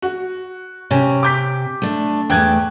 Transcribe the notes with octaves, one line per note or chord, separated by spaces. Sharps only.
F#4
C3 C#4
D6 G6 B6
A3 D4
E2 A3 G5 F#6 G#6